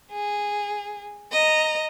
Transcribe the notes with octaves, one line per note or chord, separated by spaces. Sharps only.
G#4
D#5 A#5